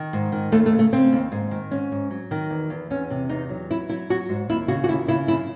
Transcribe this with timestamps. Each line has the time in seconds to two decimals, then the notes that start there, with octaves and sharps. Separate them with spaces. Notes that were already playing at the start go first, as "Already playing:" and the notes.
Already playing: D#3
0.13 G#2
0.32 D#3
0.52 D#2 A3
0.66 A3
0.72 C#3
0.79 A3
0.93 C#3 C4
1.13 D#2
1.32 G#2
1.51 D#3
1.71 G#2 C#4
1.92 G#2
2.10 F#3
2.31 D#3
2.50 E2
2.70 E2
2.90 E2 C#4
3.10 C3
3.29 E2 D#4
3.49 F#3
3.70 F#3 E4
3.89 F#3 E4
4.10 F#3 F#4
4.29 G#2
4.49 D#2 E4
4.68 C#3 F#4
4.84 F#4
4.88 D#2 E4
5.08 C#3 E4
5.28 F#2 E4